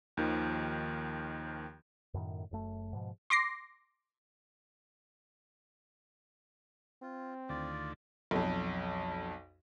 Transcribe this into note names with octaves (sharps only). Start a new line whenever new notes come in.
D#2 D#3 F3
F#2 A2 D#3
F#1 F#2 A3
G#2 B2 F3
C6 D6 A#6 C7
C4 F4
D2 D#3 A3 F4 D5
B1 F2